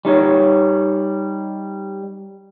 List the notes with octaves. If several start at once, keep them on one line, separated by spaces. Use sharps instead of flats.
G3 D#4 C#5